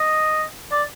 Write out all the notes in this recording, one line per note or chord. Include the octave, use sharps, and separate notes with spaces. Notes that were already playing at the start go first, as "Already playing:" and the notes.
Already playing: D#5
D5